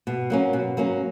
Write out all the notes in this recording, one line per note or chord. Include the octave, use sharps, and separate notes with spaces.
B2
F#3 A#3 C#4
B2
F#3 A#3 C#4